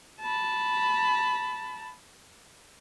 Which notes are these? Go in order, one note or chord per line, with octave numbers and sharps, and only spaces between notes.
A5 B5